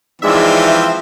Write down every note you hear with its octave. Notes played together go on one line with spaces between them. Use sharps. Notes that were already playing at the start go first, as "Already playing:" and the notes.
E3 F3 G#3 C4 D#4 D5 E5